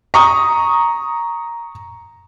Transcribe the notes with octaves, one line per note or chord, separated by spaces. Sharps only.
A#5 C#6 D#6